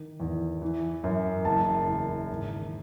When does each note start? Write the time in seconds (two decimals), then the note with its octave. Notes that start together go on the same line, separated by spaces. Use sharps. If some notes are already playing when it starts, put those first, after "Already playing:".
Already playing: D#3
0.20 E2
0.62 E3
1.04 F#2
1.45 F#1 A5
1.87 E2
2.29 G#1